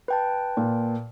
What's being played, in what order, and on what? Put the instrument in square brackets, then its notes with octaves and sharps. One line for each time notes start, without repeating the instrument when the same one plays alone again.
[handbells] B4 G5 A5
[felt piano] A#2